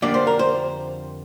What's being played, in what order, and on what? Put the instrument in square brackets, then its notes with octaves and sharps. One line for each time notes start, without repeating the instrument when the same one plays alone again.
[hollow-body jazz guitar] F2 D3 G3 A#3 D4 D5
C5
A#4
C5